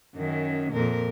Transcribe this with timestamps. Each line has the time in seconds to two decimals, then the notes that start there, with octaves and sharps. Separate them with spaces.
0.15 F#2 D#3 C#4
0.73 F2 A#2 A#4